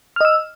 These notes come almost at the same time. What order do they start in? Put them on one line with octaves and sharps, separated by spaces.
F6 D#5 E6